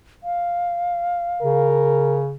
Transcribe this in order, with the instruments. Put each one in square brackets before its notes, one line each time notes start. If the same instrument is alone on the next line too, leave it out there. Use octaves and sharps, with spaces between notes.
[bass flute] F5
[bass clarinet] C#3 [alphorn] A#4